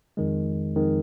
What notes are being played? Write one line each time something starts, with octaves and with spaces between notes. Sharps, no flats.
F2 D#3 G#3
F2 D#3 G#3